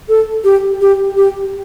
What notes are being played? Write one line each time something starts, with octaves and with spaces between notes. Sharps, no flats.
A4
G4
G4
G4